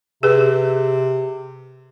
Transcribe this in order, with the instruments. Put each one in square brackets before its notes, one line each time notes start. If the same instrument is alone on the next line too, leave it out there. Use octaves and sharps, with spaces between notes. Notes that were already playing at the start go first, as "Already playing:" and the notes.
[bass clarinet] C3 [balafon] G#4 B4